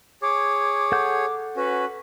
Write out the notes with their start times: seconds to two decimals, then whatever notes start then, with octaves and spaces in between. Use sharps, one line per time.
0.22 G#4 C#5 D6
0.92 A4 F#5 G6
1.56 C#4 F#4 B4